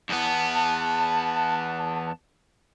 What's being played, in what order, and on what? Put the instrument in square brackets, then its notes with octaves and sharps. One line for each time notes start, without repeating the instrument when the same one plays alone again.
[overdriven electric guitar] E2 B3 [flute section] A5